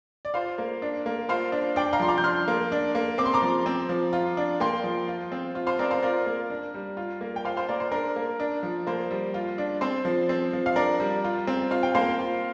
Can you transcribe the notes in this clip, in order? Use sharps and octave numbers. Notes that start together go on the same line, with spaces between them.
D5
F4 C5 F5
A#3
D4
A#3
F4 C5 F5
D4
D4 D5 G5
F5 A#5
F3 C6
A#5 D6
G6
D4 C6 F6
A#3
D4
A#3
C4 D6
C6
A#5 D6
F3
C4
F3
F4
D4
A#3 G5 C6
F3
F4
C4
F4
C5 F5
C4 A#4 D5
C5 F5
F4 A#4 D5
A#3
D4
G3
F4
A#3
G5
F4 C5 F5
C5 F5
A#3 A#4 D5
C5
D4 A#4
A#3
D4
F3
A#3 C5
G3
F4
D4
C4 C5
F3
C4
F3
F5
D4 A#4 D5
G3
F4
C4
F4 F5
G5
A#3 C5 F5
F4